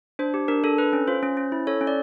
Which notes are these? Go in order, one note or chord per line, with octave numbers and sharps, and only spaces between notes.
D4 C5
G4
D4 A#4
D4 A4
A4 B4
C#4
F4 C5
C#4
C#4
E4
A4 C#5
C#4
D5